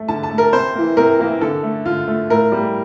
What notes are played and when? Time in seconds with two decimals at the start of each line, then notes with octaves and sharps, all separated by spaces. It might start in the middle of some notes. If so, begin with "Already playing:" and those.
Already playing: A3
0.08 D3 A5
0.23 A5
0.31 A3
0.38 A#4
0.52 C3 C5
0.75 E3 A#3
0.97 C3 A#4
1.19 E3 A#3
1.41 D3 A4
1.63 A3
1.86 D3 F4
2.08 A3
2.30 A2 A#4
2.52 G3 A#3